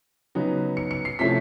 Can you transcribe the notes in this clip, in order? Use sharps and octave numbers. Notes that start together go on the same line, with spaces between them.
C#3 F#3 B3 D#4
C#7
C#7
C7
C3 F3 A3 C#4 E4 B6